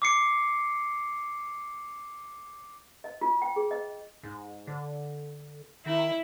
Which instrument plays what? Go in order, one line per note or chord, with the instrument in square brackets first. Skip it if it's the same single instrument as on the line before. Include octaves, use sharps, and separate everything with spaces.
[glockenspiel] D6 C7 C#7
[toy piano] D#5
F4
G5
G#4
D#5
[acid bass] G#2
D3
[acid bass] D#3 [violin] E4